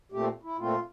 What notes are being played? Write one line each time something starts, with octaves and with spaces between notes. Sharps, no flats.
A#2 A3 C4 G4
E4
A#2 A3 C4 F4